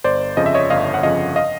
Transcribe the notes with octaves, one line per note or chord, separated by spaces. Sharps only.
G1 C5 D5
F2 C#3 F3 D#5
E5
C#5 D#5
G1 D#5 F5
F#5
F2 C#3 F3 D#5 F5
D#5 F5